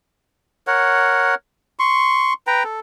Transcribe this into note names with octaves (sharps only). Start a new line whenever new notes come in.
A#4 C#5 F#5
C6 C#6
B4 G5 A#5
A4